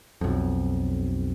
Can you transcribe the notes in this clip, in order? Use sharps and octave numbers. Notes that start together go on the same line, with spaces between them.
B1 F2